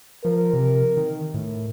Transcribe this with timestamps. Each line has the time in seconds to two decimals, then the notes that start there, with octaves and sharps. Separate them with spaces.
0.25 F3 A#4
0.53 C3
0.97 D#3
1.34 A2